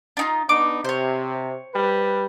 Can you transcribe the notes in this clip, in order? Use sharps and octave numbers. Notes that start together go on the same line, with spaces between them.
D4 D#4 F4
B3 D4 D#4 D6
C3 C5 C#5
G3 B4